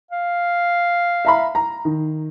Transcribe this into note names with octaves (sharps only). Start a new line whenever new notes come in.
F5
E5 A#5 B5
A#5
D#3